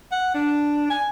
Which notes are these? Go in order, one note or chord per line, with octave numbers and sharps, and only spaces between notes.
F#5
D4
G#5